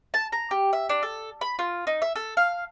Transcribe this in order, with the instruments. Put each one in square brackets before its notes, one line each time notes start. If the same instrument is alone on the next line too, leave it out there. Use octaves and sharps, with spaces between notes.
[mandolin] A5
A#5
G4
E5
D4
A4
B5
F4
D#4
E5
A4
F5